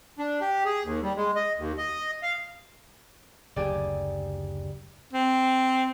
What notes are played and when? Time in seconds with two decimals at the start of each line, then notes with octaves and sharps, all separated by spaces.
0.19 D4
0.41 G4
0.65 G#4
0.84 D#2
1.03 G3
1.17 G#3
1.36 D#5
1.58 D#2
1.78 D#5
2.23 F5
3.56 F#1 D2 G4 G#4 D5
5.13 C4